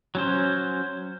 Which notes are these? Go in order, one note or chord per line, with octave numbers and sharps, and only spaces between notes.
F#3 C#4 C5